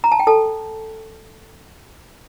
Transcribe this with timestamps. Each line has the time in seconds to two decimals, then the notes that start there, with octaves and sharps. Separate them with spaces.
0.04 A#5
0.12 A5
0.19 G5
0.27 A4 A5